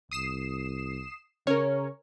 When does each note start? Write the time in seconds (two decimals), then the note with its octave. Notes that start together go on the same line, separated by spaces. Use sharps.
0.11 C2 D#6 C7 E7
1.47 C#3 C#4 A#4 C#5